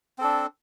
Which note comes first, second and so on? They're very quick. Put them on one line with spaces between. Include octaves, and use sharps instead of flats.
C4 A4 D4